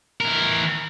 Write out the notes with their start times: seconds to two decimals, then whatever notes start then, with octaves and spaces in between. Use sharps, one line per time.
0.21 E3 A#4